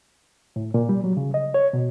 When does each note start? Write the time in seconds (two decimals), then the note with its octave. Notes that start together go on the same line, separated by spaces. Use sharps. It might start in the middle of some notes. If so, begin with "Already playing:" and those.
0.56 A2
0.74 A#2
0.89 G3
1.04 F#3
1.17 C#3
1.34 D#5
1.54 C#5
1.73 B2